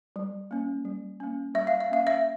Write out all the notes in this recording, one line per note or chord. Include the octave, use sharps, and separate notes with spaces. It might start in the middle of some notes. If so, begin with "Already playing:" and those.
G3
A#3 C#4
G3
A#3 C#4
G3 E5
F5
E5
A#3 C#4 F5
E5